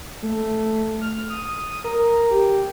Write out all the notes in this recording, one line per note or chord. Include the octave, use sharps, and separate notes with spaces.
A3
F6
D#6
A#4
G4